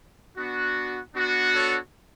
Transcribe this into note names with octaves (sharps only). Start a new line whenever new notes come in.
B3 D4 F#4
B3 D4 F#4
A4 C#5